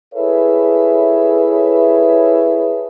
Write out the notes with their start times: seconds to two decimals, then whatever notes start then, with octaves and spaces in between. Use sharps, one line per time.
0.14 E4 G#4 A4 B4 C#5 E5